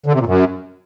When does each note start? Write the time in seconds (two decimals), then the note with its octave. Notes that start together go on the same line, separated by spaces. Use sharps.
0.06 D3
0.13 C3
0.20 A#2
0.26 F#2